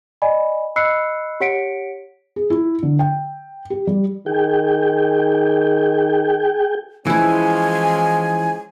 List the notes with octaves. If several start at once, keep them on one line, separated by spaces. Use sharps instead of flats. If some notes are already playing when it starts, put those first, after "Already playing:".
D5 D#5 G#5 B5
D#5 B5 E6 F#6 C7 C#7
G4 C#5 F#5 B6 C#7 D7
G#4
E4
D3
G5
G4
G3
D#3 G#4 G5
E3 F3 G#3 C#4 E4 G#5